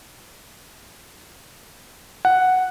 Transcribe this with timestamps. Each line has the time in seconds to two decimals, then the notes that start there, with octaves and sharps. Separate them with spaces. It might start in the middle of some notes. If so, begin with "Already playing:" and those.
2.25 F#5